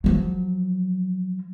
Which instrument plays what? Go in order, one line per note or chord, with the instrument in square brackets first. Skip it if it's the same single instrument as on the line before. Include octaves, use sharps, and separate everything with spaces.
[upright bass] F3 F#3